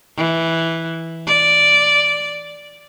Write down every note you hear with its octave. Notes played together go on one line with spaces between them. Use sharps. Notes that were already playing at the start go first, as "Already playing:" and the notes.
E3
D5